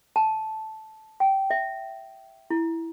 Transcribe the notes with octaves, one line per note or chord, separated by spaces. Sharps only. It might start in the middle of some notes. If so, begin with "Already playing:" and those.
A5
G5
E5
E4